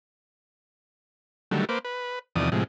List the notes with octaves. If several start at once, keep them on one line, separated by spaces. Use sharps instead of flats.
D3 D#3 F#3 G3 A3
A#3 B4 C5 D6
B4
E2 C3 D#3 F3 D5 D#6
A2 C3 F3 G#3